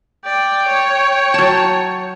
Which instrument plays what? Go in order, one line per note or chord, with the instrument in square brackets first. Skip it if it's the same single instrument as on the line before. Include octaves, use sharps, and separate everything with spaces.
[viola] D5 [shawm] G5
[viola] C#5
[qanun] F#3 A5